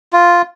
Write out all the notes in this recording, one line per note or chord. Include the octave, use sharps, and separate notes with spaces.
F4